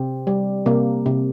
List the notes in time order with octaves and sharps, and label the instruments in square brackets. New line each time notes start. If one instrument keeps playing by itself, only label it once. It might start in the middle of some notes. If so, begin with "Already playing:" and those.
Already playing: [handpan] C3 C4
G3
C3 A#3
C3